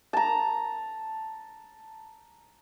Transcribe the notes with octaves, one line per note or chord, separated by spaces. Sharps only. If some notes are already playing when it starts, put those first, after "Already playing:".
A5 A#5